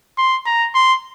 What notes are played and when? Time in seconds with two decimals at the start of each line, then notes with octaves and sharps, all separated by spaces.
0.18 C6
0.46 A#5
0.75 C6